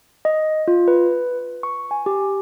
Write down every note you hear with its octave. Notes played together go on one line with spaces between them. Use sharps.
D#5
F4
B4
C#6
G#5
G4